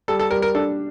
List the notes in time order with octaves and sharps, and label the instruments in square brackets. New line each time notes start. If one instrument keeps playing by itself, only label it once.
[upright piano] G3 [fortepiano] A4
[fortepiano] A4
[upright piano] G3 [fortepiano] A#4
[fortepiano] A#4
[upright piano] D4 [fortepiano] A4